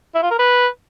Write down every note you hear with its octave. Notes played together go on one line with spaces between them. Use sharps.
E4
F4
A#4
B4